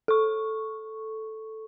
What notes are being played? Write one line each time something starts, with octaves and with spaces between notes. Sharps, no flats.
A4 C#6